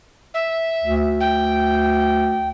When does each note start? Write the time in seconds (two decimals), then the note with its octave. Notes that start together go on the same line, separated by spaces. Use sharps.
0.34 E5
0.84 D2
1.20 G5